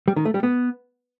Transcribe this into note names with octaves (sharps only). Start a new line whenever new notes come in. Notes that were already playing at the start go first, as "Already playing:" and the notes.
G3
D#3
A3
G3
B3